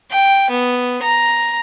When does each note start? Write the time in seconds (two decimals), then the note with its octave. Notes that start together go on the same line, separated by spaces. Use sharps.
0.12 G5
0.50 B3
1.02 A#5